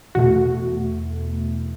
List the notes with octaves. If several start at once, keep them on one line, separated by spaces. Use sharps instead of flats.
E2 B2 A3 F#4